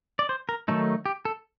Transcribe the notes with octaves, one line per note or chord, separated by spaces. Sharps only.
D5
C5
A#4
D#3 F#3 A3 D#4 A4
G4
A4